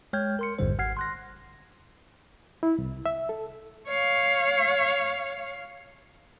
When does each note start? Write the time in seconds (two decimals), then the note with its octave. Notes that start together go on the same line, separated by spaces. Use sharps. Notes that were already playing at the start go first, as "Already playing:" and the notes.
0.13 G#3 C#5 G5 F6 G6 G#6
0.39 A#4 C6 C#7
0.59 A1 F2 G#2 D3 G3 C5
0.79 G#1 F#5 F6 G#6 C7
0.97 C6 F#6 A#6
2.63 E4
2.78 C2
3.06 E5
3.29 A4
3.87 C#5 F5